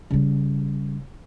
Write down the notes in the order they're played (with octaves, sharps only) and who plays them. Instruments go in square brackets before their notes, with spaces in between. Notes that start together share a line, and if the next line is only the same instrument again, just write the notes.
[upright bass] C#3 G3